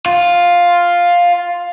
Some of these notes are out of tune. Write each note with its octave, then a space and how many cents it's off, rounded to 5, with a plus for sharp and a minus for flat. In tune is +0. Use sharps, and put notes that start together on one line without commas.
F4 +5